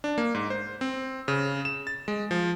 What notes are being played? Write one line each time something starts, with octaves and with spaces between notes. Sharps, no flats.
D4
A#3
G#2
C5
C4
C#3
E7
A6
G#3
F3